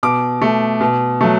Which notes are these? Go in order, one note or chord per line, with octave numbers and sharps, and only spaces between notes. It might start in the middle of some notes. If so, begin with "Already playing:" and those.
B2 D6
A3
B2
F#3 A3